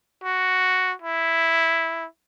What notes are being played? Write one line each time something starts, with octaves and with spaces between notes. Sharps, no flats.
F#4
E4